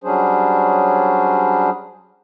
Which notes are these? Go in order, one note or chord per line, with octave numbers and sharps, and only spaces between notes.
F#3 G3 C#4 D4 G#4 C5